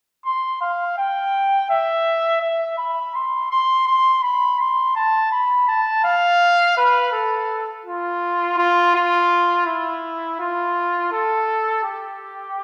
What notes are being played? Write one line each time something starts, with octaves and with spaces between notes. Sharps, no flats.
C6
F5
G5
E5
E5
B5
C6
C6
C6
B5
C6
A5
B5
A5
F5
B4
A4
F4
F4
F4
E4
F4
A4
G4